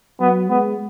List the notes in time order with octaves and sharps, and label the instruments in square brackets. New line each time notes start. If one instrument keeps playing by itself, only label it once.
[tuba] F#3 [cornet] B3
[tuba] G#3 [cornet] B3